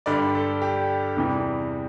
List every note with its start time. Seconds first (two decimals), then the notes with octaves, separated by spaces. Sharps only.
0.06 G2 D3 G3 D5
0.35 A4
0.62 G4
1.17 E2 C3 E3 G3